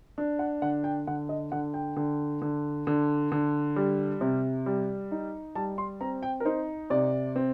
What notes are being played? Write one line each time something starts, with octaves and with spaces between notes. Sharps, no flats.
D4
F#5
D3 F#5
G5
D3 F#5
D#5
D3 F#5
G5
D3
D3
D3
D3
G3
C3
G3
D#4
G3 A5
C6
C4 A#5
G5
A#4
D#4 C5
C3 D5
C4